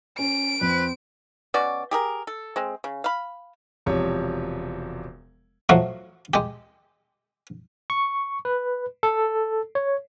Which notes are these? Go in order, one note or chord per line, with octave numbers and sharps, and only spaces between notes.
C#4 D7
F2 C4 B4
B2 C#4 F#4 D5
G4 G#4 A#4
A4
G#3 C4
C#3
F5 B5
E1 C3 F3 C#5
F3 F#3 A3 F#4
G#3 G4
C#6
B4
A4
C#5